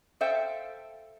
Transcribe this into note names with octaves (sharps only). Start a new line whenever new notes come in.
A4 C5 E5 F5 G5